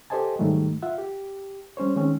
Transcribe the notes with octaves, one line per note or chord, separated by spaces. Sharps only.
G4 A4 C5 D#5 G#5 A5
G#2 D#3 F#3 G3 A3
F4 E5 F#5
G4
G3 C#4 C5 C#5
D#3 G#3 C4 C#4